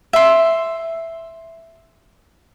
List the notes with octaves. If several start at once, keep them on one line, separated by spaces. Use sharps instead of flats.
E5 C6